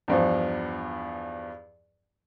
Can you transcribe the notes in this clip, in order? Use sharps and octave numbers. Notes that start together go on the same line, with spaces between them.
E2 G2 F3